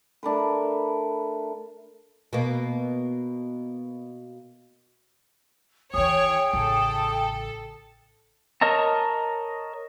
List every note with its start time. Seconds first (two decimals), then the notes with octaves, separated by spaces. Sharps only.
0.23 A3 D4 A#4 B4
2.33 B2 A#3
5.94 D#3 E3 G#4 C#5 G5
6.53 A1 C#3 A4
8.61 A#4 C#5 D#5 A5 A#5